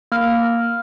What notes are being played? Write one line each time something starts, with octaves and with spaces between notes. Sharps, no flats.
A#3 F6